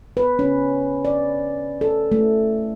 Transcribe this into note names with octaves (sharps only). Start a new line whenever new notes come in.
B4
C#4
D5
A4
A3